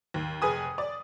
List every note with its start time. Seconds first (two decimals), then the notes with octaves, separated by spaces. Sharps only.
0.14 D#2
0.42 F1 G#4 B4 G#5 D#6
0.78 D5